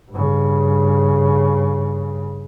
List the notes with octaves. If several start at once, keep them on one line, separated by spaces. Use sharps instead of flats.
G2 C#3